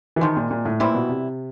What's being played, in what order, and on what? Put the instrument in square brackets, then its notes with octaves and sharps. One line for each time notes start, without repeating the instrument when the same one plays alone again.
[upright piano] E3
[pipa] C3 F3 G#3 [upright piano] D#3
[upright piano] A#2
A#2
A2
[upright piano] A#2 [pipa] E3 G3 C4 E4
[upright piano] B2
C3